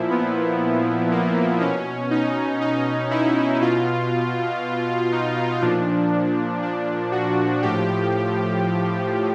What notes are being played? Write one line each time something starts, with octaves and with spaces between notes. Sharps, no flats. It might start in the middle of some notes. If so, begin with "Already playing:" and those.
Already playing: A#2 F3 E4
B3
A#3
B2 C#4
D#4
D#4
E4
B2 F4
D#4
A#2 F3 D4
D4
F#4
A2 F3 G4